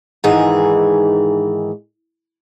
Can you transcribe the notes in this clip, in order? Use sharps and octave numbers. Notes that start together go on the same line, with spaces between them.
G#2 D#3 E3 G#4